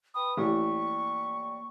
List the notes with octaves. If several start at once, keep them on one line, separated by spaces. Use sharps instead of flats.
B4 G5 B5 D#6
A1 A#3 D5 G5 C#6